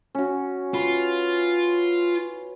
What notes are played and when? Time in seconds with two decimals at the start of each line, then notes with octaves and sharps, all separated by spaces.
0.15 C#4 F#4
0.74 F4 B4